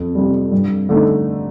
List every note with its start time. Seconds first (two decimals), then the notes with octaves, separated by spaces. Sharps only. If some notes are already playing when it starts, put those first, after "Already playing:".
Already playing: F2
0.15 C3 G3
0.52 G2
0.89 D3 A3 D#4